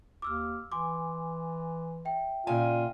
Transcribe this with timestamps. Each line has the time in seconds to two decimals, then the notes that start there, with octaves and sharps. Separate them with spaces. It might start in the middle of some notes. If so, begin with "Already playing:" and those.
0.22 D#2 D6 E6 F6
0.72 E3 G#5 C6 D6
2.05 E5 G5
2.47 A#2 C#3 F4 G#5